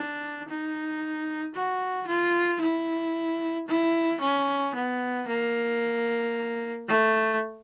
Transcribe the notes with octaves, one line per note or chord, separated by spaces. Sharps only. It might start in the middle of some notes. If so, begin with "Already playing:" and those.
Already playing: D4
D#4
F#4
F4
E4
E4
C#4
B3
A#3
A3